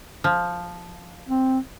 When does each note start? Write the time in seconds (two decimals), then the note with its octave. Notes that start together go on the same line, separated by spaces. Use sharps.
0.24 F3
1.28 C4